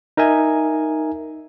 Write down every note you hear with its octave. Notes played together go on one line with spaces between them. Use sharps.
D#4 A#4 E5 G#5